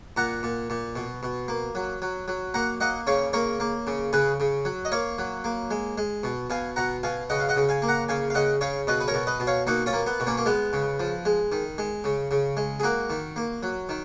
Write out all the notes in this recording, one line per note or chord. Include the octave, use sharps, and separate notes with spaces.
A#2 F#5 A#5
A#2
A#2
B2
B2
A#3
F#3
F#3
F#3
A#3 F#5 A#5
A#3 D#5 F#5
C#3 C#5 F5
A#3 A#4 C#5
A#3
C#3
C#3 G#4 B4
C#3
F#3
D#5
A#3 C#5 F5
F#3
A#3
G#3
G#3
B2
B2 F5 G#5
B2 F#5 A#5
B2 F5 G#5
C#3 D#5 F#5
F5
D#5 F#5
C#3
F5 G#5
A#3
F#5 A#5
C#3 F5 G#5
F5
C#3 D#5 F#5
C#3 C#5 F5
B2 B4 D#5
B4
A#4 C#5
B2
B4 D#5
B2
C#5 F5
A#3 D#4 F#4
C#4 F4
A#3
B3
B2
A#3 C#4
A#3
G#3 B3
C#3
F3
G#3
D#3
G#3
C#3
C#3
G#3
G#4
A#3 F#4 A#4
D#3
A#3
F#3
D#3